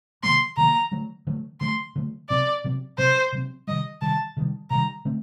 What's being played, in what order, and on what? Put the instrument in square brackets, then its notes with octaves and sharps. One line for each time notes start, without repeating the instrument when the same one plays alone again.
[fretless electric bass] C3 D#3 F#3 A#3 [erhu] C6
[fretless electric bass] C3 D#3 F#3 A#3 [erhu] A#5
[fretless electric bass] D3 F#3 A3
D3 F#3 A3
[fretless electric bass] D3 F#3 A3 [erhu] C6
[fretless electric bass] D3 F#3 A3
[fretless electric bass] C3 F#3 C4 [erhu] D5
[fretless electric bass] C3 F#3 C4
[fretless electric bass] C3 F#3 C4 [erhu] C5
[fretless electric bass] C3 F#3 C4
[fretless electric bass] C3 D#3 G3 [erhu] D#5
[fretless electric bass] C3 D#3 G3 [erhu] A5
[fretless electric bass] C3 D#3 G3
[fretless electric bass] C3 D#3 G3 [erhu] A#5
[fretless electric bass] D3 A3 C4